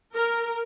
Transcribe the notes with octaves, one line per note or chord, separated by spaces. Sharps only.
A#4